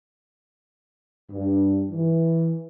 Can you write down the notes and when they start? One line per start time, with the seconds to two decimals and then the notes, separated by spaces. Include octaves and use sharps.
1.32 G2
1.92 E3